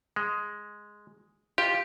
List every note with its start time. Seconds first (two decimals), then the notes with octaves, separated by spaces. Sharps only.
0.16 G#3
1.58 F4 G4